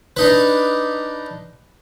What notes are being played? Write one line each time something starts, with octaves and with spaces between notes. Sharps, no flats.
D4 D#4 B4